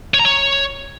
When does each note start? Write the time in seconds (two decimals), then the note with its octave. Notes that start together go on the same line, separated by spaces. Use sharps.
0.14 C#5
0.19 A#5
0.25 C#5